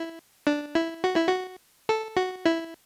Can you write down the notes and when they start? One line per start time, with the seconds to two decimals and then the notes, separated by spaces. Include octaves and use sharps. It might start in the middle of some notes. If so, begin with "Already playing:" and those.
Already playing: E4
0.47 D4
0.75 E4
1.04 F#4
1.16 E4
1.28 F#4
1.89 A4
2.17 F#4
2.45 E4